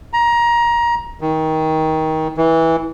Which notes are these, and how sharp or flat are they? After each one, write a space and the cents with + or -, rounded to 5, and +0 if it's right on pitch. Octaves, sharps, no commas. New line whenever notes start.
A#5 +20
D#3 +20
E3 -15